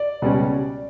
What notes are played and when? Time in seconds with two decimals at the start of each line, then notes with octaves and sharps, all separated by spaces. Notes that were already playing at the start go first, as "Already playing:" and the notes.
Already playing: D5
0.22 C#2 B2 G3 C#4